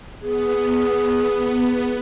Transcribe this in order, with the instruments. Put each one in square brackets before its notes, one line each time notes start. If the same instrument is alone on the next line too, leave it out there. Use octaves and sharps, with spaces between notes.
[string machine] B3 [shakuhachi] G#4